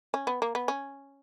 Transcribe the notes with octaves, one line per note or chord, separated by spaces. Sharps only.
C#4
B3
A#3
B3
C#4